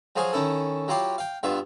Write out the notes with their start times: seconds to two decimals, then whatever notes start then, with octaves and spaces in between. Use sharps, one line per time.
0.16 F3 F#3 G#4 C5 F5 G#5
0.33 D#3 C#4 E4 A4
0.88 F#3 E4 F4 G4 F5
1.18 F5 G5
1.43 G2 B3 F4 E5